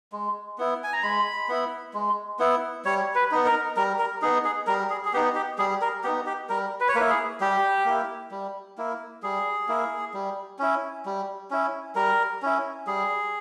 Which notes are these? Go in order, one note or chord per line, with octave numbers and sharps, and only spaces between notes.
G#3
B3 E4
G#5
A#5
G#3 B5
B3 E4
G#3
B3 E4
G3 C#5
B4
B3 D#4
A#4
G3 A#4
A#4
B3 D#4 G#4
G#4
G3 A#4
G#4
G#4
B3 D#4 G4
G4
G3 G#4
A#4
B3 D#4 G4
G4
G3 A#4
B4
C#5
A#3 B4
E4
G#4
G3 G4
A#3 E4
G3
A#3 E4
G3 G#4
A#3 E4
G3
C#4 E4
G3
C#4 E4
G3 A#4
C#4 E4
G3 G#4